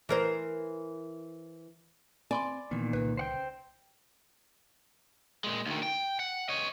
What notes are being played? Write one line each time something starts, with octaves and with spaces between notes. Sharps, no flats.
E3 A#4 C5
C4 D5 G#5 B5 C6
A#2 D#3 E3 B3
C2 C#3 B4
C5 F#5 G5
A#2 G#3
D2 D#3
G5
F#5
C#5 D#5